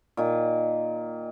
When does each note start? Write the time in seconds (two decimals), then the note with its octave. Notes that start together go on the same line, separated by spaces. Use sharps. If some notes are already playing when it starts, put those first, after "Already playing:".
0.17 A#2 D#3